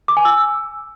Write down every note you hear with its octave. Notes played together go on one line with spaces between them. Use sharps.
D6
G#5
E6